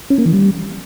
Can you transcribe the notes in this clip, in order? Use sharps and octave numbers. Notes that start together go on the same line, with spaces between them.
C#4
A#3
E3
G3